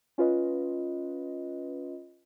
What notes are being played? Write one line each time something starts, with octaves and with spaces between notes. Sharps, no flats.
C#4 F4 B4 D#5